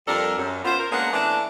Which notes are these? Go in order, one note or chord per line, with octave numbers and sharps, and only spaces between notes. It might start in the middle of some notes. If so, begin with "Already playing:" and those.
F2 G3 D4 A4 A#4
F#2
B3 F4 C5
A#4
G#3 A#3 B3 C#4 D4 F#5
E3 A3 B3 D4